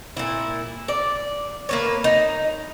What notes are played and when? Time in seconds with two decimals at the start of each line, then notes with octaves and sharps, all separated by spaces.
0.17 A#2 E4
0.88 D5
1.69 A#3 B4 C#5
2.04 D#4